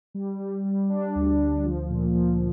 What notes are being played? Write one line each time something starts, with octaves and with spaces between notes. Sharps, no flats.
G3
G3
G3
D4
D2
D2
F3
A#2
F3